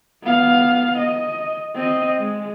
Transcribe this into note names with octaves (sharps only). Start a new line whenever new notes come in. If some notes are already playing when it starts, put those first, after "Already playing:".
B3 F5
D#5
C4 D#5
G#3